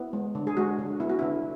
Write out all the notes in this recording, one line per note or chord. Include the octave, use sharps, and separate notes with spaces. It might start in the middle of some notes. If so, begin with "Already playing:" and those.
Already playing: B3 E4
G#3
D3
G#4
G#3 F#4
D3
B3 E4
F#4
D3 E4